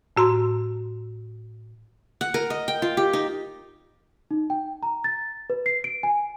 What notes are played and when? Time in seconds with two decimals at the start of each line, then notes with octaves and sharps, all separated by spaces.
0.17 A2 F#4 A#5 C6
2.21 F#5
2.34 A#4
2.50 D#5
2.68 G5
2.82 F4
2.97 G4
3.13 D#4
4.31 D#4
4.50 G5
4.83 A#5
5.04 A6
5.50 B4
5.66 C7
5.84 D7
6.03 G#5